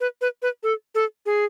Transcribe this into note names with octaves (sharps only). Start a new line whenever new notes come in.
B4
B4
B4
A4
A4
G#4